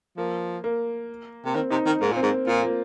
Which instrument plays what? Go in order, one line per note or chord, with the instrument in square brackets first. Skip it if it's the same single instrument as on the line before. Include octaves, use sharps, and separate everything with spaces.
[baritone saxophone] F3 [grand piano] A#3
[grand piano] A#3
[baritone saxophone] C3 [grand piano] A#3
[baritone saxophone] D#3 [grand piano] C4
[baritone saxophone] C3 [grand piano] D#4
[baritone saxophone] D#3 [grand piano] D#4
[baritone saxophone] G#2 [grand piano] A#3
[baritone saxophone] A#2 [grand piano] C4
[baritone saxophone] G#2
[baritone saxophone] A#2 [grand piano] F4
[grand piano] A#3